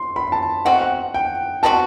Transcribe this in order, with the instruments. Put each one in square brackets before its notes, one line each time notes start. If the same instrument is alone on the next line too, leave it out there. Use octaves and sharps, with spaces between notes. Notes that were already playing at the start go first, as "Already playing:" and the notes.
Already playing: [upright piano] C6
B5
A5
[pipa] B2 A3 C4 F#4 [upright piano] F#5
[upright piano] F#5
G5
[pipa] B2 G3 C4 F#4 [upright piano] A5